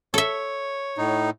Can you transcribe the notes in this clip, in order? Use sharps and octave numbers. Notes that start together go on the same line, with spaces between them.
A4 C#5 E5
A2 D#4